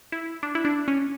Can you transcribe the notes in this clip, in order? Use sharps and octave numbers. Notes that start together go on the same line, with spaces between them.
E4
D4
E4
D4
C#4